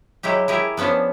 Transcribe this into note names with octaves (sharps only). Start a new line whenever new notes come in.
F#3 G#3 E4 G4
E4 G4 G#4 A#4
F3 B3 C#4 D4